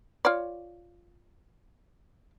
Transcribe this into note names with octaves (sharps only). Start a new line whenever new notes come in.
F4 C#5 D5